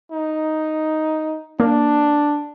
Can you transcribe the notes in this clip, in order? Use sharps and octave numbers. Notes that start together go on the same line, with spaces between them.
D#4
A#3 D4